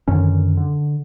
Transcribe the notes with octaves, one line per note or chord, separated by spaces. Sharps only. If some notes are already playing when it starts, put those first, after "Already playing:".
F#2 D3 D#3 C#4
D3